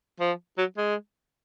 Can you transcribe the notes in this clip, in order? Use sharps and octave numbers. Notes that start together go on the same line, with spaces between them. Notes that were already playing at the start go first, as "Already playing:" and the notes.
F3
F#3
G#3